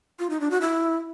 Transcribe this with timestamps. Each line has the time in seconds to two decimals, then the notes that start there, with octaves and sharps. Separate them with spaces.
0.19 F4
0.30 D#4
0.40 D4
0.51 F#4
0.61 E4